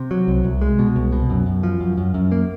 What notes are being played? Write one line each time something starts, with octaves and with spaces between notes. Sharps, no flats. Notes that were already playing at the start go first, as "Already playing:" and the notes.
Already playing: C3
F#3
C2
C2
G#3
B2
C2
B2
F#2
F#2
F3
F#2
F#2
F#2
A#3